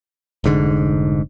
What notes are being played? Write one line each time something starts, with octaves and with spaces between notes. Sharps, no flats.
F1 G#2 D3